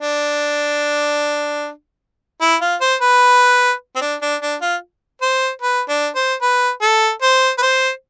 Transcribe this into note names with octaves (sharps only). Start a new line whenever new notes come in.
D4
E4
F4
C5
B4
C4
D4
D4
D4
F4
C5
B4
D4
C5
B4
A4
C5
B4
C5